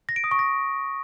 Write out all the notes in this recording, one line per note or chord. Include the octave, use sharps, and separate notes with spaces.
A#6
D7
D#6
C#6
A#6